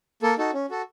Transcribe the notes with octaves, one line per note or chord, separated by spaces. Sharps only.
A#3 A4
D#4 F#4 A4
C#4
F#4 A4